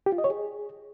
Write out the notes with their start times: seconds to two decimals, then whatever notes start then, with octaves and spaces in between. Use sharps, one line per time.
0.06 G4
0.12 F4
0.18 D#5
0.24 C#5
0.30 G#4